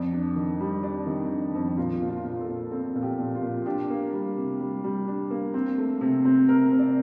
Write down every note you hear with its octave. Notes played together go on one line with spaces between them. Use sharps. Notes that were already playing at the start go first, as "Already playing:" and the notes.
Already playing: F2 D5
D4
D#3
G3
D4 D5
D#3
D4
F2
A#2 F4
A#2
F4
A#2
A4
A#2
C4 A4
A#2
G4
A#2
F4
A#2
D4 G4
A#3
G3
C3
G3
G3
D4
A#3
C4
A3
C3
C4
C3 A#4
C3
D5